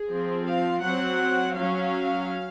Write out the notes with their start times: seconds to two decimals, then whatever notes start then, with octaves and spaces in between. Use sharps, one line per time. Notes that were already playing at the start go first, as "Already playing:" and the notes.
Already playing: G#4
0.09 F3 C4
0.46 F5
0.83 F#3 C4 F#5
1.57 F#3 C#4 F5